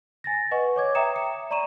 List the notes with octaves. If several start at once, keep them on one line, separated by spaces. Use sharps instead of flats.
G#5 A6 A#6
B4 D#5 F#5 G#5 C#6
C#5 D6 G#6
E5 G5 A#5 D#6 C#7 E7
C#7
D5 A#5 B5 C#6 D#7 E7